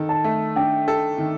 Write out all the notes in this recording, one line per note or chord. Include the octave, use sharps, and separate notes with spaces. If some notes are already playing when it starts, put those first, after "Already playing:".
Already playing: D#3 A4
A5
A3
D4 G5
A4
D#3